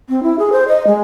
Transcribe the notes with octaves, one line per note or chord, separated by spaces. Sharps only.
C4
E4
G#4
C5
D#5
G#3